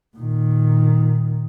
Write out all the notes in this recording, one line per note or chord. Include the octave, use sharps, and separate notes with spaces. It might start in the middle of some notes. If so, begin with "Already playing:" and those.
A#2 D#3